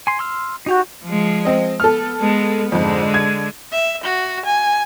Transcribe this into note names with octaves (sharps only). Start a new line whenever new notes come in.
G#5 C6
C6 E6 F6
D#4 F#4 G4 G6
F3 G#3
C4 D#5
B3 A4 F6
G#3 B3
F2 G#2 D3 G#3
G#6
E5
F#4
G#5